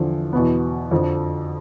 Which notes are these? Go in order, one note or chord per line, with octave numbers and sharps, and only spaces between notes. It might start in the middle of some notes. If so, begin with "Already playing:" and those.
Already playing: E2 D3 F3
E2 B2 B3
F2 D3 F3